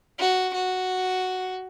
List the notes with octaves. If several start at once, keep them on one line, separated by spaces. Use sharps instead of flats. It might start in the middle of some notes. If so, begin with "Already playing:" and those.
F#4
F#4